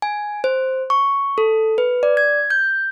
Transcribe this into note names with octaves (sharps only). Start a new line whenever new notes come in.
G#5
C5
C#6
A4
B4
D5
G#6
G6